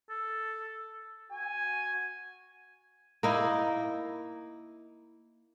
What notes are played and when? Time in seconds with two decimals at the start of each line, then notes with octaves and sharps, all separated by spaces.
0.09 A4
1.31 F#4 G#5
3.23 A#3 D#4 E4